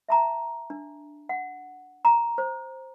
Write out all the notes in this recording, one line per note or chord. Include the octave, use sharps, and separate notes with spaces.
E5 A5 A#5
D4
F#5
A#5
C5